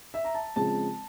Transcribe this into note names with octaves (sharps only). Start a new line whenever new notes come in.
E5
A#5
A5
C#3 F3 G#3 C4 A5